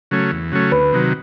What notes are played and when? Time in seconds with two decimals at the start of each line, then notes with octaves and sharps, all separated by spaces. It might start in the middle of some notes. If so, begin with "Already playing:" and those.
0.11 C#3 F#3 A3 C#4
0.32 E2
0.52 C#3 F#3 A3 C#4
0.72 D2 B4
0.93 C3 D#3 F#3